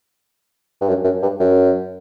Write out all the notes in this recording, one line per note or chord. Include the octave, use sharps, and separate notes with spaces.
G2
F#2
F#2
G2
F#2